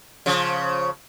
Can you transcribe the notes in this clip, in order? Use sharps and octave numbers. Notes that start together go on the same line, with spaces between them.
C#3 F3